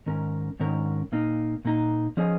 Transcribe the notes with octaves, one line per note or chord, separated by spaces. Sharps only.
G#2 D#3 C#4 A#4
G#2 D#3 C#4 A#4
A#2 A#3 D#4
A#2 A#3 D#4
F3 C#4 G#4 D#5